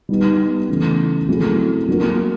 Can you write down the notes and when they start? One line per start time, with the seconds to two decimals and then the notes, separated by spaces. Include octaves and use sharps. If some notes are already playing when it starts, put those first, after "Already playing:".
0.09 G3 B3 D#4
0.69 C#3 E3 A3
1.29 F#3 A3 C4 E4 G#4
1.88 F#3 A#3 D4 F#4 A#4